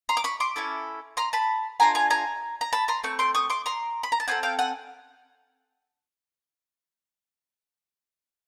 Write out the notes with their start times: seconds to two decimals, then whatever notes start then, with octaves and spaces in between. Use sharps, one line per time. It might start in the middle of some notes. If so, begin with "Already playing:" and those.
0.09 A#5 C6
0.17 D6
0.24 B5 C#6
0.40 C6 D6
0.56 C#4 E4 A4
1.17 A#5 C6
1.33 A5 B5
1.80 A3 D4 F4 G#5 A#5
1.95 G#5 A#5
2.10 G#5 A#5
2.61 A#5
2.73 A5 B5
2.88 A#5 C6
3.04 A3 C4 C#6
3.19 C6 D6
3.35 C#6 D#6
3.50 C6 D6
3.66 A#5 C6
4.03 B5
4.12 A#5
4.20 A5
4.28 C4 F4 A4 F#5 G#5
4.43 F5 G5
4.59 F#5 G#5